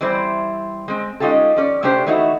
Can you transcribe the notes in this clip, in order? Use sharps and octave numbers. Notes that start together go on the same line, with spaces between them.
E3 G3 C4 E4 C5
G#3 C4
G#3 C#4 D#4 F4 G4 A4
F3 C#4 D5
C3 A3 C#4 D4 G4 C5
E3 A3 D#4 E4 F#4